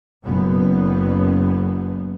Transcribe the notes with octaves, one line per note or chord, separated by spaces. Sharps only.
F#1 F#2 F#3 B3